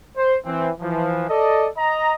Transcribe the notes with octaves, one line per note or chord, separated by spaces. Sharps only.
C5
E3 C4
E3 F3
A4 D5 D#5
D#5 A#5